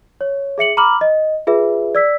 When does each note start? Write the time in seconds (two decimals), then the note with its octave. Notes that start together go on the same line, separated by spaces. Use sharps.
0.21 C#5
0.58 G#4 E5 C#7 F#7
0.77 A#5 B5 D6 F6 F#7
1.01 D#5
1.47 F4 G#4 B4 E5
1.95 D5 E6 B6